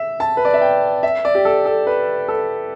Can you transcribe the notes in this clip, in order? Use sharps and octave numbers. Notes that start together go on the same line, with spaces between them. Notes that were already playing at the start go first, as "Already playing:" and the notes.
Already playing: E5
A5
B4
D5
E5
G5
E5
D5
G4
A4
A4
B4
A4